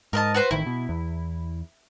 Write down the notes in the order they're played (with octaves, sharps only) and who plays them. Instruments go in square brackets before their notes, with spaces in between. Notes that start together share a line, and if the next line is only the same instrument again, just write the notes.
[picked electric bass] G#2 [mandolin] A#4 D#5 A5
[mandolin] F#4 B4 C5
[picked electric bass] A1 D#3 [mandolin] E4
[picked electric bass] B2
E2